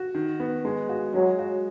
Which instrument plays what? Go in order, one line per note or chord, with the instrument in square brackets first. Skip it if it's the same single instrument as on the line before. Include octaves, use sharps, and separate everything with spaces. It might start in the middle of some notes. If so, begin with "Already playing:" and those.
Already playing: [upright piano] F#4
D#3
B3
G#3
F#4
[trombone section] F#3 [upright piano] G#3
[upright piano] F#4